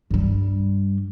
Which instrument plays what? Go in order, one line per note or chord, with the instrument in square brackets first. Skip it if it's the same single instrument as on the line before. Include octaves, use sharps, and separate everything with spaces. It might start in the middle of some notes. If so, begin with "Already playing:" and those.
[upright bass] G2 G3